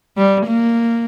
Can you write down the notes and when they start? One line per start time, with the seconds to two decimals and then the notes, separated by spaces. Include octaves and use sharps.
0.18 G3
0.47 A#3